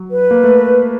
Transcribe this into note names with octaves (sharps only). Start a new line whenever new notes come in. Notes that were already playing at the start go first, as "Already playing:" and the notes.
Already playing: F#3
B4
A#3
A3